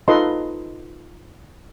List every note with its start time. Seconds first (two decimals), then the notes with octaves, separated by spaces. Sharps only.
0.08 D#4 F4 A4 B4 D#5 C6